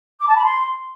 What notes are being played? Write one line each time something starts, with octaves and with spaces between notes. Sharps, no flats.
D6
A5
B5
C6